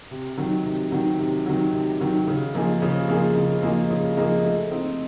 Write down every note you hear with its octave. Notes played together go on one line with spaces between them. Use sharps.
C3
D#3 F#3
C3
D#3 F#3
C3
D#3 F#3
C3
D#3 F#3
C#3
F3 A#3 D#4 G#4
C#3
F3 A#3 D#4 G#4
C#3
F3 A#3 D#4 G#4
C#3
F3 A#3 D#4 G#4
A3
C4 D#4